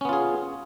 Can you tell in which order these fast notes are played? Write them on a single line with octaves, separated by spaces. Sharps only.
C#4 B3 F4 G#4